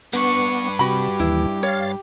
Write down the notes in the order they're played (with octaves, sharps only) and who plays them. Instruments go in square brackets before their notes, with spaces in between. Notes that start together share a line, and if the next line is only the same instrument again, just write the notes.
[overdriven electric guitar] G2 B4 [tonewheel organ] B3 [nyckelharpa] D4 C#6
[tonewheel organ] C3 [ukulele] F#4 B5 [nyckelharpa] G4
[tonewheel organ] D#2 E3 [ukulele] E4
[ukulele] C#5 [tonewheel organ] F5 A6